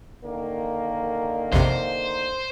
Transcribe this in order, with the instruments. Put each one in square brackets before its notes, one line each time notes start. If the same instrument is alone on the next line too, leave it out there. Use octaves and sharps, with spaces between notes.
[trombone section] D3 D#3 A#3
[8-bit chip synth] A#1 F2 C3 [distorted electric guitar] C5